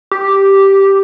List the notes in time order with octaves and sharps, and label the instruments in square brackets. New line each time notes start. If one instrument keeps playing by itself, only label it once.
[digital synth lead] G4